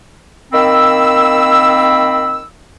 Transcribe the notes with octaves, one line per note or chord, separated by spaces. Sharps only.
D#3 A#3 C4 B5 E6